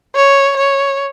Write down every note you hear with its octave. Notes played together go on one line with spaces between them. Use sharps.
C#5
C#5